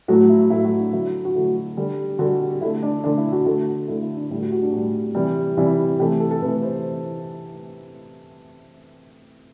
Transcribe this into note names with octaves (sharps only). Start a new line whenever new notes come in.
A2 F#3 A3 F#4
E4
A2 F#3 A3 E4
F#4
D4
D3 F#3 A3 E4
F#4
D3 F#3 A3 E4
F#4
D3 G3
D3 G3 F#4
D3 A3 E4
D4
D3 A3 D4
E4
F#4
D3 A3 F#4
D3 A3 E4
E4
D4
A2 G3 E4
F#4
F#4
D4
A2 G3
C3 E3 G3
C3 E3 G3 E4
C3 E3 A3 G4
A4
A4
C3 E3 A3 B4
C5